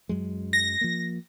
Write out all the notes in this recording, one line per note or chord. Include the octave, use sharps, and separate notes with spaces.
F#2 F#3 G#3
A#6
F3 A#3